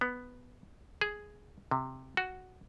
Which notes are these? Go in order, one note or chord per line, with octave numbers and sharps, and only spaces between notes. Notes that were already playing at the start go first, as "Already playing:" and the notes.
B3
G#4
C3
F#4